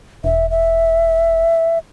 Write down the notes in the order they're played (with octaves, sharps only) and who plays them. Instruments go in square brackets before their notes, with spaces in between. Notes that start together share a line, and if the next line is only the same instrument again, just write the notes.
[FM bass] E1 [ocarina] E5
[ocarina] E5